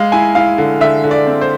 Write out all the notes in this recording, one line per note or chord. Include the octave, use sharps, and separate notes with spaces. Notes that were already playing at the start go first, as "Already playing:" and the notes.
Already playing: G#3 F5
E4 G#5
E4 F5
D3
D3 E5
D3
D5
C4
C5